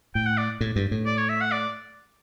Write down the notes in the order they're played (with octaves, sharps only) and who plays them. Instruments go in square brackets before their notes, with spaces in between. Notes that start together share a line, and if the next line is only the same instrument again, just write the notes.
[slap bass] A2 [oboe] G5
[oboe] F#5
D5
[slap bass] A2
G2
A2
[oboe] D5
C#5
E5
F#5
D5